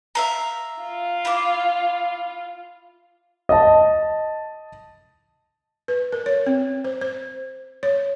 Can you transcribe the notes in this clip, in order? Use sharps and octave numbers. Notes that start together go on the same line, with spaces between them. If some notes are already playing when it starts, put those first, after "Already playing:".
E5 F5 A#5
F4
E4 D6
D#5 A5
B4
A#4
C#5
C4
C5
C5
C#5